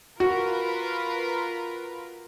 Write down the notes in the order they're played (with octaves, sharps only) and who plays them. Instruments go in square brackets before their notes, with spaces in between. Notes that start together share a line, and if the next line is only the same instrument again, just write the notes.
[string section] F4 A#4 B4 [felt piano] F#4